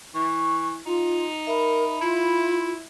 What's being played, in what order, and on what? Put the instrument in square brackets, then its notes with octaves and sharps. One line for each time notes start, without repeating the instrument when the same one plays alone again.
[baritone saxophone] E3 [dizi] C#6
[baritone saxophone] D#4 [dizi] F4
[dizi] A#4 [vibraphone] E5 B5
[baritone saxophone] E4 [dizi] F4